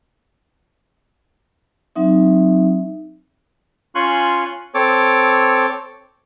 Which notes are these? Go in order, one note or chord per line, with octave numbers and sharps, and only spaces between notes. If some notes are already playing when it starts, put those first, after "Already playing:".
F#3 C4 D#4 E5
C#4 F4 G#5 C6 C#6 F#6
C4 A4 C#5 D6